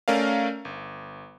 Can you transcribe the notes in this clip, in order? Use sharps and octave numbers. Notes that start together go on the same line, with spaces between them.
A3 C#4 A#4 D5 F5
G1